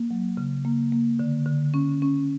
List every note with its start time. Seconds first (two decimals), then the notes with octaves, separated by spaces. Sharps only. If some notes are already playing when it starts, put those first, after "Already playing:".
Already playing: A#3
0.11 F#3
0.37 C#3
0.65 A#3
0.92 A#3
1.19 D3
1.46 D3
1.74 C#4
2.02 C#4